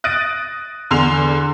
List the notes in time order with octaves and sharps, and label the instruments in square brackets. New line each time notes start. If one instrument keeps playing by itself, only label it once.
[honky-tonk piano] D#6 F#6 A6 A#6 D7 D#7
E2 D3 C6 F7